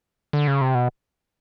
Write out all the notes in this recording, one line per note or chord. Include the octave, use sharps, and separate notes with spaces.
D3
C#3
C3
B2